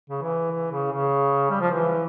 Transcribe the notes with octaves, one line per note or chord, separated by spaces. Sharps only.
C#3
E3
E3
C#3
C#3
G3
F3
E3